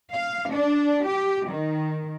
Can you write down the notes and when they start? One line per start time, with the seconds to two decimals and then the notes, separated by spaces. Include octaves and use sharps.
0.12 F5
0.50 D4
1.06 G4
1.49 D#3